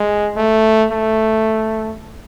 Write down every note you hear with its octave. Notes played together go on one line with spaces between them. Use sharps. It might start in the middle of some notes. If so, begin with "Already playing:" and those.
Already playing: G#3
A3
A3